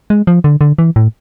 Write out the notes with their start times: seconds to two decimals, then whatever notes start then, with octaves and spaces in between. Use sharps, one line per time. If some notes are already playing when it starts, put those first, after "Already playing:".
0.10 G#3
0.27 F3
0.44 D3
0.61 D3
0.78 E3
0.96 A2